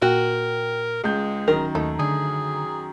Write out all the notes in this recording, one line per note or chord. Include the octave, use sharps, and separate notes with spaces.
A#2 F#4 A#4 G5
C#2 G#3 G6
D1 F#2 D#3 A#4
D#2 A3 D#4
D3 G#4